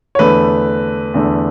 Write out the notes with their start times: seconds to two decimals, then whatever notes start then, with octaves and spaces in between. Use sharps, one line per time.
0.15 C#5
0.19 E2 D3 A3 B4
1.14 E2 D3 A3